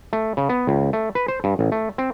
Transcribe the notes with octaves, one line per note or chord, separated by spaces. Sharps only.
A3
C#3
B3
C#2
A3
B4
C5
G2
A1
A3
C4